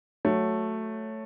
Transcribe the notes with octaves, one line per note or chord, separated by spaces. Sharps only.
F#3 A3